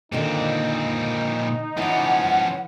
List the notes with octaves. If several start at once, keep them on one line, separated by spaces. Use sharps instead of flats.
A#2 D3 D#3 C4 D#4 D5
E3 F3 C#4 F#5 D6